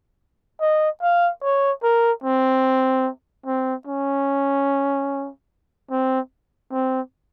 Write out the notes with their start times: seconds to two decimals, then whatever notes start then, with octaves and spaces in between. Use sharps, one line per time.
0.61 D#5
1.02 F5
1.43 C#5
1.83 A#4
2.24 C4
3.46 C4
3.87 C#4
5.91 C4
6.72 C4